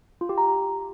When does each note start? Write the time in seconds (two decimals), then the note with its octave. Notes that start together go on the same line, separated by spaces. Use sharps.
0.21 F4
0.29 G4
0.38 A#5